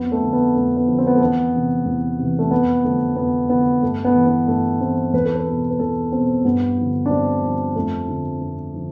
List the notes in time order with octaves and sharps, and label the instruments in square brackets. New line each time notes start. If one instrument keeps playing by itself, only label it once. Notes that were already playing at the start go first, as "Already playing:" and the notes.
Already playing: [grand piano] F2 B3
A3
D3 F3
B3
F2 A3
B3
D3 F3
C4
B3
A3
E2 B3
C3 E3
E2
C3 E3
A3
F2 B3
D3 F3 A3
F2 B3
D3 F3 B3
G2 A3
B3
E3
B3
G2 A3
E3 C4
E2 B4
A4
B4
B2
B4
E2 A4
B2 C4
G2 B3
D3 F3
D4
G2 C4
D3 F3
F2 A3
D3 F3
F2
D3 F3